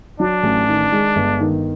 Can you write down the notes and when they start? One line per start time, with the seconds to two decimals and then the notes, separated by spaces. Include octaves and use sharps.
0.19 F#3 D4
0.43 A1
0.68 D#3
0.92 G#3
1.16 G1
1.40 D#3